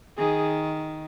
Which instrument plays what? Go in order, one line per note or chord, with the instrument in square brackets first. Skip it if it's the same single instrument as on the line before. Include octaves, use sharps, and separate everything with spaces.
[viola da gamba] D#3 [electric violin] G#4